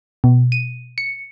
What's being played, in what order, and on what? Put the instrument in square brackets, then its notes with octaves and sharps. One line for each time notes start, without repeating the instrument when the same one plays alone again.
[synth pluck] B2
D#7
C#7